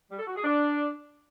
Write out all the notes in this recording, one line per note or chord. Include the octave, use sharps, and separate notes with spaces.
G3
A4
F#4
G#4
D4